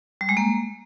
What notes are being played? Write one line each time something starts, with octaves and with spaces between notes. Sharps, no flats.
G3
G#3
A#3